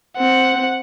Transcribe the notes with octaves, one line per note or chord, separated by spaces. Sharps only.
C4 F#5